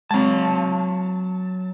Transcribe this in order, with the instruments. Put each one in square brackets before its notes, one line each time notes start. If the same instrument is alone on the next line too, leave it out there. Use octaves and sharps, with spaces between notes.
[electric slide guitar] F#3 A5 [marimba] G#3 C4